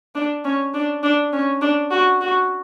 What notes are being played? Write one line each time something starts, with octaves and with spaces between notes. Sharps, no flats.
D4
C#4
D4
D4
C#4
D4
F#4
F#4